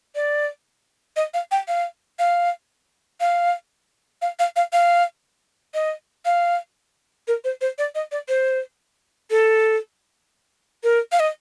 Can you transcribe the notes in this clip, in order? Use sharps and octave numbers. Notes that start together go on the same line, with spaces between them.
D5
D#5
F5
G5
F5
F5
F5
F5
F5
F5
F5
D#5
F5
A#4
C5
C5
D5
D#5
D5
C5
A4
A#4
F5
D#5